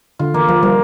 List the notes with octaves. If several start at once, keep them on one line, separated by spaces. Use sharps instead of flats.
D3 F4
E3 A#3
F3 A#3
G3 A#3